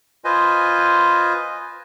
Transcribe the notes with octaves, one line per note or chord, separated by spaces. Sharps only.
F4 B4 C5 D#5 G#5